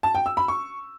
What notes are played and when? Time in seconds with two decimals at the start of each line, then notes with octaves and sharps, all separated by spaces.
0.03 A5
0.15 G5
0.26 E6
0.37 B5
0.48 C#6